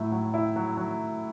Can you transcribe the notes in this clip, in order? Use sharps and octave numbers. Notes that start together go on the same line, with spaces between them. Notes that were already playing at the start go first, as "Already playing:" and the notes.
Already playing: A2 F#3 E4
F#3
E4
F#3
F#3